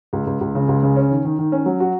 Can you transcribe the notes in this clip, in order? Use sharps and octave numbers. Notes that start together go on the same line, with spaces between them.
C#2
C#2
C#2
C#3
C#2
C#3
C#4
D#3
D#3
D#3
C#4
F#3
F#4